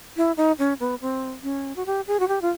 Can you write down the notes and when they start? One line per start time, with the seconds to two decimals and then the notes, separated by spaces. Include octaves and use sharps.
0.17 E4
0.37 D#4
0.59 C#4
0.80 B3
1.01 C4
1.43 C#4
1.76 F#4
1.86 G4
2.07 G#4
2.20 F#4
2.28 G4
2.42 F4